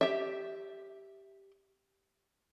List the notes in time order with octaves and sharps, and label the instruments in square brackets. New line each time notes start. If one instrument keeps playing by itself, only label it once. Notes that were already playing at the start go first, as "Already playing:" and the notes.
[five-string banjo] G4 E5